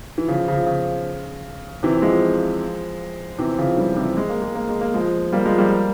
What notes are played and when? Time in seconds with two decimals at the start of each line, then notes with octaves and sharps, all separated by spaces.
0.18 E3
0.28 C#3 F3
0.48 C#3 F3
0.66 C#3
1.83 C3 E3
2.02 F3 G#3
3.39 C3 E3
3.58 C#3 F3
3.77 E3 G3
3.97 C3 E3
4.17 G#3
4.29 A#3
4.42 G#3
4.55 A#3
4.69 G#3
4.81 A#3
4.94 F3 G#3
5.33 G3 A#3
5.45 F3 G#3
5.58 G3 A#3